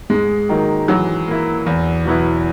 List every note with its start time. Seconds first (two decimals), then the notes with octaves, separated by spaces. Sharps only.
0.10 G#2 G#3
0.49 D#3 F#3 A#3 D#4
0.88 E3 F#3
1.28 A#3 E4
1.66 E2
2.05 B2 F#3 B3 E4